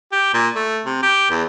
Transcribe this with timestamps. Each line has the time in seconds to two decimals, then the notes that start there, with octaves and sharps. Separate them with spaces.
0.12 G4
0.34 A#2
0.55 A3
0.86 C3
1.03 G4
1.31 E2